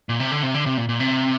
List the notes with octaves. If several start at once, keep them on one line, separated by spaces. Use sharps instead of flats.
A#2
C3
D3
C3
D3
C3
A#2
A#2
C3